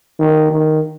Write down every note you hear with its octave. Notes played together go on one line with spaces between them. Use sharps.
D#3
D#3